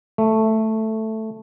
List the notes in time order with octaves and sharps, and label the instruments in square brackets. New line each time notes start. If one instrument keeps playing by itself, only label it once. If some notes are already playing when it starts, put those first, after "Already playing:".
[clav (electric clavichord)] A3